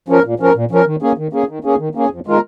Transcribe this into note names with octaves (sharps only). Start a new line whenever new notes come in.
F3 C#4 A#4
A#2
F3 C#4 A#4
A#2
F3 C#4 A#4
D#3
A#3 C#4 G#4
D#3
A#3 C#4 G#4
D#3
A#3 C#4 G#4
D#3
A#3 C#4 G#4
F2
D#3 G#3 F4 A#4